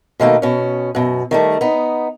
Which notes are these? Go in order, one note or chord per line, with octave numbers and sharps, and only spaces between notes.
B2 D#3 A3 A#3
B2 C#4
F#2 B2
D#3 G3 A3
B3 D#4